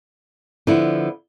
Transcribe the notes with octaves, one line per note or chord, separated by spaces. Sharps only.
D3 F3 B3 E4